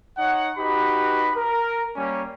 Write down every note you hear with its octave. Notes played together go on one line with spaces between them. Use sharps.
D#4 C#5 F#5
D#4 F#4 G4 B4 B5
A#4
G3 A#3 C#4